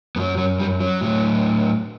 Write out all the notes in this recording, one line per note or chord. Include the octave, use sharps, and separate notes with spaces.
F#2 F#3 B3
F#3
G3
F#3
A2 F#3